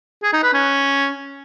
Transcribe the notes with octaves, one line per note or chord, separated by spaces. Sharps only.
G#4
D#4
B4
C#4